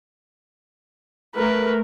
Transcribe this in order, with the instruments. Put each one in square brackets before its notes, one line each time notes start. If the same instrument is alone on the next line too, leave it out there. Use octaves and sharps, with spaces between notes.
[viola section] A3 A#4 [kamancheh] B4